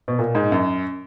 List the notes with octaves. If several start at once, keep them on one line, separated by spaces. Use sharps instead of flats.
B2
A#2
G#2
F#2